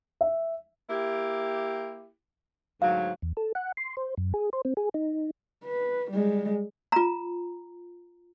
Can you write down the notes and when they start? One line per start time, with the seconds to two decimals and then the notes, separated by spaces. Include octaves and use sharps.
0.21 E5
0.90 A#3 E4 G4
2.82 D2 G#2 F#3 F5
3.22 E2
3.37 A4
3.55 F#5
3.77 C6
3.97 C5
4.17 F#2
4.34 G#4
4.53 C5
4.65 C4
4.77 G#4
4.94 D#4
5.64 B4
6.11 G3 G#3
6.92 F4 A#5